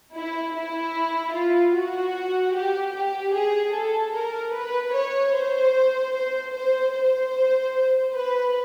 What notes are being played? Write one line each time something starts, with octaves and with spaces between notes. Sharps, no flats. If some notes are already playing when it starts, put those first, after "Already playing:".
E4
E4
F4
F#4
G4
G4
G#4
A4
A#4
B4
C#5
C5
C5
C5
C5
B4